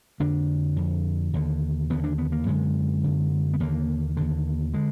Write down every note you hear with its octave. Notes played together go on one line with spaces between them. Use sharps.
F2 D3 D4
F2 D3
D#2 D3
D#2 D3 B3
D4
B3
A#3
F#2 D3 G#3
F#2 D3
B3
D#2 D3 A#3
D#2 D3
D3 G#3